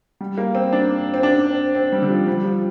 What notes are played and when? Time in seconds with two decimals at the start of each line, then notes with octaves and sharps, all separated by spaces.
0.21 G3
0.38 A#3
0.55 C4
0.73 D4
1.14 C4
1.23 D4
1.50 C4
1.75 C4
1.92 G3
2.02 D3
2.10 F3
2.27 G3
2.45 F3